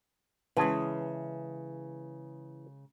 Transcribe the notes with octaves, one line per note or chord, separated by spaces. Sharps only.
C#3 E3 G#3 G#4 B4 A5 C6